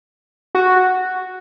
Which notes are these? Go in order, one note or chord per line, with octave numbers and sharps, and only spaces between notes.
F#4